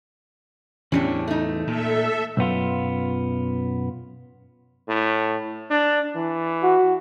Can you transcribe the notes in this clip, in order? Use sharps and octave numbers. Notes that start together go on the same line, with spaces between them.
E2 A2 E3 C#4 D4 G4
A3 D#4
A#2 A4 E5
B1 F#2 B3 F4
A2
D4
E3
F#4